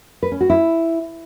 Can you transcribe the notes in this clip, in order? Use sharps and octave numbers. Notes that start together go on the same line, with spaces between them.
B4
C#4
F#4
E4